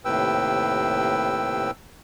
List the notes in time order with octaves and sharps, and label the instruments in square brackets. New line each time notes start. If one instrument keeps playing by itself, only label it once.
[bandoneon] D#2 A2 C3 B4 G5 E6